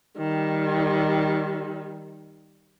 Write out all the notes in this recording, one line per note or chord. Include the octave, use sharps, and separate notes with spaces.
D#3 G3